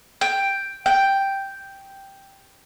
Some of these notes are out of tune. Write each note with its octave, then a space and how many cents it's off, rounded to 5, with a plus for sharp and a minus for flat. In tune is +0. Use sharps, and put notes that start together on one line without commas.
G5 +5
G5 +0